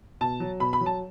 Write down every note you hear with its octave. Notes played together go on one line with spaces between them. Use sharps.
B2 A5
F#3
B2 B5
B5
F#3
A5